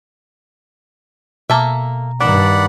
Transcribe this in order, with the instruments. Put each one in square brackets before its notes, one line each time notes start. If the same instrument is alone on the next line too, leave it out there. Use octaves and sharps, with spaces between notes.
[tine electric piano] B2 A#5 [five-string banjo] A#3 A4 E5
[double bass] G2 D#3 [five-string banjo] D4 [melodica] D5 F#5 B5